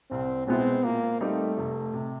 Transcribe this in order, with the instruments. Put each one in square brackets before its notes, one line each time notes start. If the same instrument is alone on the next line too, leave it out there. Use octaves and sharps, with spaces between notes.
[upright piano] C2 [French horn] C4
[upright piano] B2 G#3 B3 E4 [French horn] C4
[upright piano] A#2 [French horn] A#3
[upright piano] G3 C4 D#4 G4 [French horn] A3
[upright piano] F1
C3